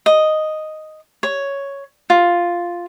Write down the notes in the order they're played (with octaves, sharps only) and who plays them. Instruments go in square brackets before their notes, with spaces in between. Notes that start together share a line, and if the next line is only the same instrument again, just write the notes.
[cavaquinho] D#5
C#5
F4